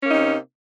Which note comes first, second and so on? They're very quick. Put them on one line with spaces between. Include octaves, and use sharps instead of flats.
C#4 A#3 D#4 C3